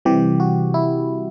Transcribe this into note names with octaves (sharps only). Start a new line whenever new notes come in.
C3 E3 G3 G4
F#4
E4